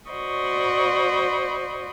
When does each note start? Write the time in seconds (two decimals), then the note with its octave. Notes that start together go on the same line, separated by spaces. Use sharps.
0.10 F#4 C5 D5 D#5 B5 C#6